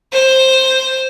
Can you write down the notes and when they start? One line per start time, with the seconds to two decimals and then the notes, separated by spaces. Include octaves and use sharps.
0.13 C5